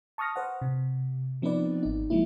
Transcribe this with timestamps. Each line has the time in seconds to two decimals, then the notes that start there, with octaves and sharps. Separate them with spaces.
0.18 A5 C#6 D#6 F6 A#6
0.36 B4 C5 F#5
0.62 C3
1.42 F3 B3 C4 D#4 B4 D5
1.83 G#1 D#4
2.10 F3 F#3 G#3 A#3 E4